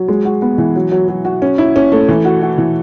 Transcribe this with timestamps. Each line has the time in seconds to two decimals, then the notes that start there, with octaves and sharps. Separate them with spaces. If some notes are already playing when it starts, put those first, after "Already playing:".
Already playing: F#3
0.08 G#3
0.25 F#4
0.42 B3
0.58 E3
0.76 F#3
0.92 F#3
1.08 F#3
1.25 F#4
1.42 C#4
1.58 E4
1.76 C#4
1.92 A3
2.09 E3
2.25 F#4
2.42 F#4
2.58 E3